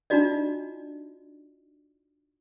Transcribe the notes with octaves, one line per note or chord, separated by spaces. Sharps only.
D4 D#4 F4 F#4 D5 D#5